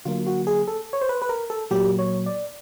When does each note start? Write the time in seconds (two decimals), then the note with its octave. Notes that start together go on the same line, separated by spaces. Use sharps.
0.05 D3 F#3 A#3 F4
0.27 F#4
0.47 G#4
0.68 A4
0.93 C#5
1.01 C5
1.09 B4
1.22 B4
1.29 A#4
1.50 A4
1.71 A#2 F#3 A#3 G4
1.99 C#5
2.26 D5